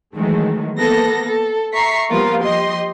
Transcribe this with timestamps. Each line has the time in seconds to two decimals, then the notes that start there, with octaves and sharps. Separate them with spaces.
0.15 D#3 E3 F#3 G#3 A3
0.78 A#3 B3 A4 A#6
1.23 A4
1.73 E5 A#5 C#6 B6 C7
2.10 F3 G3 A#3 B3 F4 A#4
2.43 F3 G4 D#5 C6